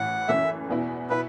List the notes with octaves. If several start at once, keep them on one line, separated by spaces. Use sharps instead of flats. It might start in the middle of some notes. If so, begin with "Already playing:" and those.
Already playing: A1 A2 E3 F#5
F#1 F#2 E3 A3 E5
E2 B2 B3 E4
B2 B3 E4 B4